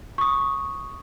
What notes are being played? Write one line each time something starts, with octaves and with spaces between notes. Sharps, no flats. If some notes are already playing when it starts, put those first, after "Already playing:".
C#6 D#6